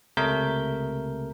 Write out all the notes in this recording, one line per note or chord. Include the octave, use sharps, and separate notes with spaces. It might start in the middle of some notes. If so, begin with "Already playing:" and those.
C#2 C3 A3 A#4 G6 B6